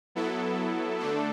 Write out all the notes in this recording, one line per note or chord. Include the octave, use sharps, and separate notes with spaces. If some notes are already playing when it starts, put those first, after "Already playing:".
F#3 B3 E4 A4
D3 A3 D4 A4